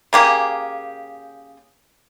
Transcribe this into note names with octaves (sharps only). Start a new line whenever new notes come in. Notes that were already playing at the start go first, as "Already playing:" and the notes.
C#3 A#3 G4 G#4